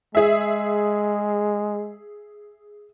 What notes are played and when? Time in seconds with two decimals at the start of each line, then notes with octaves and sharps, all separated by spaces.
0.15 G#3 G#4 E5